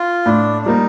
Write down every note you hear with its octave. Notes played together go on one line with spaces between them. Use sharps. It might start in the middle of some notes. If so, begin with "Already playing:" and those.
Already playing: F4
A2 D4
D4
G3 A#3 D#4